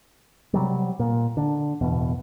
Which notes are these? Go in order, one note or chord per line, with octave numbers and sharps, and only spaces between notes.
C3 F#3 G3
A#2
D3
D1 E2 B2